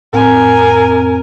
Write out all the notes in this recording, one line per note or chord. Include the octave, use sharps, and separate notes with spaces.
F2 A2 C4 A#4 G#5